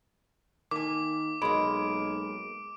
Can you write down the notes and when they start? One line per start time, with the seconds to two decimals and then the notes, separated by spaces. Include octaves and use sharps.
0.71 D#3 A#3 G#5 D6
1.42 B1 G#3 A#3 B5 D7